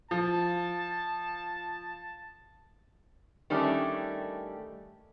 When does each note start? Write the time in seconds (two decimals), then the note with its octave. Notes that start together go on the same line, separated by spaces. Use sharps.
0.11 F3 A5
3.50 D#3 G3 A3 C#4 D4